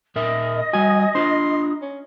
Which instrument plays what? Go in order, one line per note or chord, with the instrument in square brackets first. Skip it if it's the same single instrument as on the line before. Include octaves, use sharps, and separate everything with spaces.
[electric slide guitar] A#2 A#4 E5 [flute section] D#5 D#6
[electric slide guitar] G3 F#4 [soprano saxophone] G#5
[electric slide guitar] D4 F4 [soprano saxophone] C6
[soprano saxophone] C#4